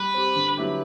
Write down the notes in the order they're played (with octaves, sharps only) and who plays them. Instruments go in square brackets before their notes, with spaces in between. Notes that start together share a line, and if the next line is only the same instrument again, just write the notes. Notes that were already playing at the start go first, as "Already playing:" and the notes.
Already playing: [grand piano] G3 [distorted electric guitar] B4
[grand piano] C4 G4
D3
F#3 B3 E4 G4